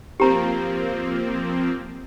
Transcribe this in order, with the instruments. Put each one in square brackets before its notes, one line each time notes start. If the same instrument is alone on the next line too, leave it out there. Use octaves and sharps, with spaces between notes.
[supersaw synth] F3 A#3 C4 [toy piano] G4 A#5